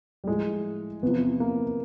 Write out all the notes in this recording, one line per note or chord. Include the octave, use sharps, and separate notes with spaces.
G3
A2 F3 G#3
E2 C3 F3 B3
A#3